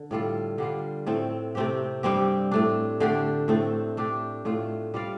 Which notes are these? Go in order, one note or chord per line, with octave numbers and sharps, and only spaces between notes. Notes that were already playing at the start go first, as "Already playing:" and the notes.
Already playing: D3
A2 G3 F4 A4
D3 G3 F4
A2 A3 C4 A4
C3 A3 C4 G4
G2 G3 C4 G4
A2 A3 D4
D3 A3 D4 G4
A2 A3 C4 A4
A3 D4 G4
A2 A3 F4
G3 F4 D5 F5